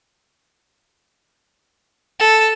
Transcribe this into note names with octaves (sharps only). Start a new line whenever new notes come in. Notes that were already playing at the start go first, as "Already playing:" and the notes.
A4